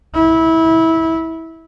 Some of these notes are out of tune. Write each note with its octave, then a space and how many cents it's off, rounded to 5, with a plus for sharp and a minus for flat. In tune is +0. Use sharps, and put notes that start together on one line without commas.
E4 -20